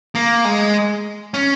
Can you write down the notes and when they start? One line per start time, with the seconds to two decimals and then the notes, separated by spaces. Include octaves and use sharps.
0.15 A#3
0.45 G#3
1.34 C#4